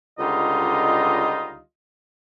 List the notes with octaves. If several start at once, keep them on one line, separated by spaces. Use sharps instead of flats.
C#2 D3 G3 D#4 F4 D#5